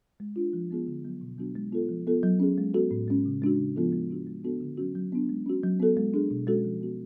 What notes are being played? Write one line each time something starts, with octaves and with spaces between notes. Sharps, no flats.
G#3
D4 F4
F3
G#3 B3 F4 G#4
D3
F#3 B3
B2
F#3 B3 D4 F#4
G#3
B3 F4 A4
F3
B3 F4 A4
F#3
C#4 G#4
G#3
B3 F#4 A4
A2
G#3 C#4
C#3
G#3 D4 F#4
C#3
F3 B3 F4 A4
G#3
D4 F#4
G#3
B3 D4 F#4 A4
D3
F#3 C#4 F#4
F#3
B3 D4
G#3
C#4 F#4
F#3
B3 F#4 A4
G#3
D4 G#4
B2
G#3 C#4 F#4 A4
F3
B3 F#4